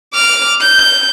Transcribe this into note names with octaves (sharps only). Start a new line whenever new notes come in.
D6 F6
G6